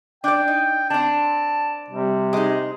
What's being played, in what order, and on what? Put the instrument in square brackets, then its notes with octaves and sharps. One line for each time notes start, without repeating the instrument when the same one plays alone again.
[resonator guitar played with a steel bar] D4 D5 [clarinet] G5
[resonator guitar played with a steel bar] D#4
[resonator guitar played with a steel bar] C4 D4 [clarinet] A5
[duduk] C3 [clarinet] G3
[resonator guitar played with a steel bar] G#3 D#4